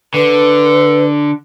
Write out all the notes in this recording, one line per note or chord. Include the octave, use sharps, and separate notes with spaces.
D3 B4